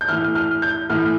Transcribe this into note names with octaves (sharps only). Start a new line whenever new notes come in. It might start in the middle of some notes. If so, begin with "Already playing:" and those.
G6
A2 E3 F6
F6
G6
A2 E3 F6